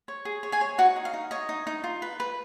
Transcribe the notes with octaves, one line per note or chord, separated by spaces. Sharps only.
C#5
G#4
C#5
G#4 G#5
C#5
D#4 F#4 F#5
D#4
F5
D#4
C#5 D#5
D#4
D#4
F4
B4
B4